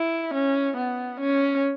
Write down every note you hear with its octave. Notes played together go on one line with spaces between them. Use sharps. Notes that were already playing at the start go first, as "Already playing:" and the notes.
Already playing: E4
C#4
B3
C#4